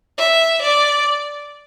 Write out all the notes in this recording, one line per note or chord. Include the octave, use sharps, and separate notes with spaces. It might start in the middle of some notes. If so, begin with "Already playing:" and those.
E5
D5